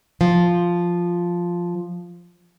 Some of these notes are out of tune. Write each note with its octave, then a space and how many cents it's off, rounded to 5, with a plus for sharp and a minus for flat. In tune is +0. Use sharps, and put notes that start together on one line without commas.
F3 +0 F5 +0